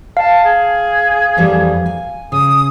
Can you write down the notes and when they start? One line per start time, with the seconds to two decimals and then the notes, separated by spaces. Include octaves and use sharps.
0.17 F5 A5
0.44 G#4
1.37 F2 E3 G3
1.86 G#5
2.32 C#3 D#6